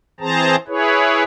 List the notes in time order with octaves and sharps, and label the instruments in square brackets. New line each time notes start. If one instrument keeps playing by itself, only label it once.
[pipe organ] E3 C4 G#4 C5 A5 A#5
E4 G#4 B4 C#5